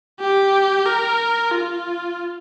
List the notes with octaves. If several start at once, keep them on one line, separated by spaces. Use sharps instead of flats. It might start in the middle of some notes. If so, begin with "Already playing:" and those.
G4
A#4
F4